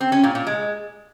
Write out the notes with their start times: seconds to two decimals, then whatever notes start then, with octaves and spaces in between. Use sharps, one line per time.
0.01 C4
0.12 C#4
0.24 A#2
0.35 A#2
0.47 G#3